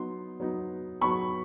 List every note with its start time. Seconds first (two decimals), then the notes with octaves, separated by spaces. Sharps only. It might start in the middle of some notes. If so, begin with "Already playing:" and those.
Already playing: F#3 B3 D#4 C6
0.40 F#3 B3 D#4
1.01 F#3 B3 D#4 B5 C#6